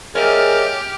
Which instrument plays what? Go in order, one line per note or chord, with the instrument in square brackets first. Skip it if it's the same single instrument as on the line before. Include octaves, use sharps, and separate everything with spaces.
[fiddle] G4 F6 [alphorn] G#4 [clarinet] A#4 [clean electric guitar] C#5 D#5 E5